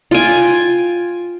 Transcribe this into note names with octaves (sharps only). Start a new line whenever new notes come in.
F4 G5 G#5